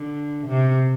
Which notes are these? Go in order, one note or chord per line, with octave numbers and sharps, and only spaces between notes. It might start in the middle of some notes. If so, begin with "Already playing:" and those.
Already playing: D3
C3